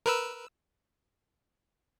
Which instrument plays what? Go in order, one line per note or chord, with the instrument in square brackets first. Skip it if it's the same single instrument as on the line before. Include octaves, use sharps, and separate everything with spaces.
[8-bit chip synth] A#4 B4 E6